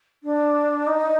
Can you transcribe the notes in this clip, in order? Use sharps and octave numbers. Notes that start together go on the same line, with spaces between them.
D4
D#4